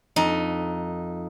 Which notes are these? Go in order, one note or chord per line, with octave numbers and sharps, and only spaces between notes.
F2 D#4